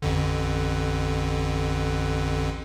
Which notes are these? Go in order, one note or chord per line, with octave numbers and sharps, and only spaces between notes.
A1 F2 D3